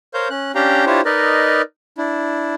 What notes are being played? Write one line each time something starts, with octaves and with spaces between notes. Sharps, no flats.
A#4 C5 C#5 F5 G6
C#4 F#6
C#4 D4 G4 F5 G5 A#5
D4 E4 F4 G4 C5 C#5
D#4 A#4 B4 D5 D#5
D4 E4